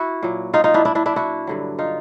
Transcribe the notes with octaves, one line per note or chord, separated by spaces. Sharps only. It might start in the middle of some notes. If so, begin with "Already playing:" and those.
Already playing: E4 F#4
A#2 F#3
D#4 F4
D#4 F4
D4 E4
D4 E4
D4 E4
D4 E4
E4 F#4
G2 D3 F#3
D#4 F4